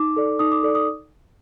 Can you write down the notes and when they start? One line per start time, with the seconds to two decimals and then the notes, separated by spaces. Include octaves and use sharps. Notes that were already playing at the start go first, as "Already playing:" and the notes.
Already playing: D#4 D6
0.17 A4 D5
0.39 D#4 D#6
0.52 D6
0.63 A4 D5
0.75 D#6